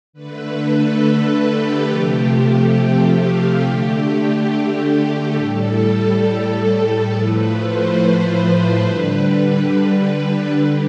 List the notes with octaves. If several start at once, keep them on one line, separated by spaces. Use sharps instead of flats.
D3 A3 B4
A4
A4
G4
C3 F3 A3
G4
F4
D3 A3 G4
G4
A2 G3 A4
A2 F3 A3 B4
C5
D3 G3 B4
D3 G4